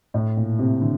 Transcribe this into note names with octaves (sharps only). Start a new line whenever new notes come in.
A2
A#2
C3
D3